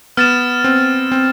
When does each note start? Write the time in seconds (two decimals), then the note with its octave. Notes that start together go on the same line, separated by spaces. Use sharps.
0.17 B3 F6 A6 E7
0.64 C4
1.12 C4